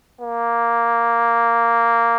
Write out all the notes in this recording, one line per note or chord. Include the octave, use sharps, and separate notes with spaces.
A#3